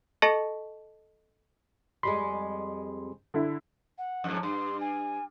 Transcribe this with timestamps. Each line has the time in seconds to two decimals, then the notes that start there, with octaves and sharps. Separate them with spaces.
0.22 A4 D#5 A5 C#6 A#6 C#7
2.03 F2 G3 G#3 B5 C6
3.34 D3 E4
3.98 F#5
4.24 F2 G#2
4.43 G2 C6
4.81 G#5